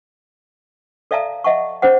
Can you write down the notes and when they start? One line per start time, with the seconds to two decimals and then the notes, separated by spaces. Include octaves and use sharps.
1.11 A4 D5 E5 F5 A5 A#5
1.44 D#5 E5 F#5 A5 C#6
1.82 C#4 G#4 C5 F#5